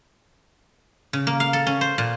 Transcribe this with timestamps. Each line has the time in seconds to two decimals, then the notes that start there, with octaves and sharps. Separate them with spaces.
1.13 C#3
1.27 A#3
1.40 F5
1.53 A4
1.67 C#4
1.81 C5
1.98 A#2